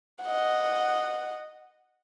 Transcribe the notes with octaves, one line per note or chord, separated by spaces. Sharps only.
D#5 F#5